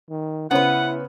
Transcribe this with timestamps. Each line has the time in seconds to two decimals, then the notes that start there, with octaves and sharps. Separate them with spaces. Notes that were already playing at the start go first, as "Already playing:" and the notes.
0.10 D#3
0.51 C#3 B3 C#4 E4 B4 C5 F#5